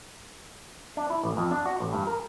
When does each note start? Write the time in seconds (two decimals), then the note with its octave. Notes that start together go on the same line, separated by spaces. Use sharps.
0.97 D4
1.10 E4
1.23 A1
1.37 F2
1.51 D4
1.66 F#4
1.80 A1
1.93 G2
2.07 A#4